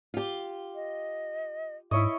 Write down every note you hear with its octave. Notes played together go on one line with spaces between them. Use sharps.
F4 G4
D#5
G#2 E4 C#5 D#5 E5